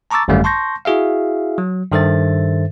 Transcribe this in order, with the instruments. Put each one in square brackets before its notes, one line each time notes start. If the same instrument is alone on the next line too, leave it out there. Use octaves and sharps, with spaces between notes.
[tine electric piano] A5 A#5 C#6 D6 E6 A6
G#1 F#2 D3 G3 A3 F5
A5 C6 C#6 G6 A#6
E4 F#4 G#4 E5 F5
F#3
G2 D#3 A4 C5 E5 A6